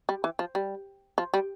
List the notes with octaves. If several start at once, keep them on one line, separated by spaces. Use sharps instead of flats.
G3
E3
F3
G3
F3
G3